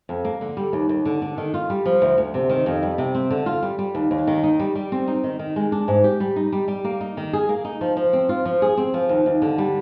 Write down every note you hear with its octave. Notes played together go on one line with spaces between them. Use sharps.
F2
A#3
D3
G3
D#2
D#2
D3
D4
D#3
F4
G3
F3
D2
D2
C3
D#3
F2
G3
C3
C4
D3
F4
G3
G3
D#2
D#2
D#3
D#4
G3
G3
C4
D#4
D#3
D#3
G#3
D4
G#2
G4
G3
D#4
G3
G3
A#3
D#4
D#3
G#4
A#3
D#4
F3
F3
C4
F4
F3
G#4
C4
F3
D#2
D#2
D3
G3